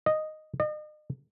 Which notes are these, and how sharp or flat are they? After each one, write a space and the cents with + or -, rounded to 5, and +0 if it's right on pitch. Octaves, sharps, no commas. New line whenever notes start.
D#5 -5
D#5 -40